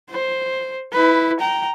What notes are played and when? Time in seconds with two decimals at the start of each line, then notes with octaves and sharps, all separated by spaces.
0.10 C5
0.93 E4 B4
1.40 G5 A#5